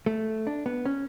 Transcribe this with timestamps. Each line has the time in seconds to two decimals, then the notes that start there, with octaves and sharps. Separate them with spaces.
0.06 A3
0.47 D4
0.66 B3
0.85 C#4